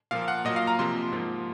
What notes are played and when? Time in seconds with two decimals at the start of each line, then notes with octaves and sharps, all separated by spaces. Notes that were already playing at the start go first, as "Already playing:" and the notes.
0.11 A#2 F3 A#3 F5
0.28 F#5
0.45 A#2 F#3 A#3 D#5
0.56 F5
0.67 A#5
0.79 C3 F3 A#3 C6
1.13 G#2 F3 A#3